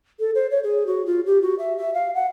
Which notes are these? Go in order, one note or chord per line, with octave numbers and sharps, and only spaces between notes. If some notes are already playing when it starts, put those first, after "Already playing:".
A4
C5
C#5
G#4
F#4
F4
G4
F#4
E5
E5
F5
F#5